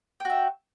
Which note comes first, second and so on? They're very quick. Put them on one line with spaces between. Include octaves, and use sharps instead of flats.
G5 F#4 E5